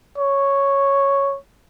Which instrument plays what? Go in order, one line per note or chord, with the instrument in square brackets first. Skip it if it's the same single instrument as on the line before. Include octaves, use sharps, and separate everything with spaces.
[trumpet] C#5